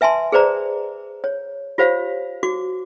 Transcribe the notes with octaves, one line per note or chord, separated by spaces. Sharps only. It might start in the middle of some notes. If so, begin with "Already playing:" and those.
B4 E5 G#5 A5 C6
G#4 B4 C5 D5 A#5
C#5
F4 G4 C5 C#5 F5
F#4 D6